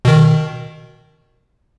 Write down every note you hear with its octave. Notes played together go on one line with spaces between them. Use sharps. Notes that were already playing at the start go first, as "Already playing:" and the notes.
B2 D#3